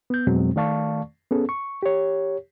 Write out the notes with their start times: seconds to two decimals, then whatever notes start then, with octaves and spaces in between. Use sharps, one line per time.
0.10 B3 G6
0.27 F2 B2 F#3 G#3 C4
0.56 D#3 A3 D5 F5 A5 C#6
1.31 B3 C#4 G#4 A4
1.49 C#6
1.83 G4 C#5